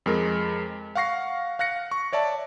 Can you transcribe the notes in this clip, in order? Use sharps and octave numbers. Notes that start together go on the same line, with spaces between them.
F2 G#3 A#4
F5 F#5 C#6 A#6 C7
F5 F#6 A#6 C#7
C#6
C#5 D5 E5 A5